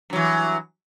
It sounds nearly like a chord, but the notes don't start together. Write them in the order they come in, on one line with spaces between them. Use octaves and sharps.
G2 F#3 E3